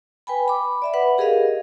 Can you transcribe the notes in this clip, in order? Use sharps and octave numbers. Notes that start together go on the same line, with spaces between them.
B4 G5 G#5 B5
B5 D6
D5 E5 B5
B4 F#5
G4 G#4 A#4 D#5 F5